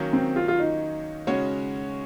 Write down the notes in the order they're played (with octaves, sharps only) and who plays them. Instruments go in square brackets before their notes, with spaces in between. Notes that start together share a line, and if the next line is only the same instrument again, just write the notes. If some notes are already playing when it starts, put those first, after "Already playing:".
Already playing: [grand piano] D#3 F#3 A#3 C#4
[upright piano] C4
F4
F4
D#4
[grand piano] C#3 G#3 C#4 F#4 C#5